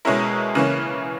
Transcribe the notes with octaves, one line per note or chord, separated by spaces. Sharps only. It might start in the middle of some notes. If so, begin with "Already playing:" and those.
B2 G#3 C#4 E4 A#4
C#3 E3 A#3 C#4